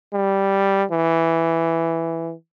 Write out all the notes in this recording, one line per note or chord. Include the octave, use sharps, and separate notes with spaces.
G3
E3